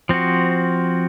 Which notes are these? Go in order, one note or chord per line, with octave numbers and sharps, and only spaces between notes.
F3 C4 F#4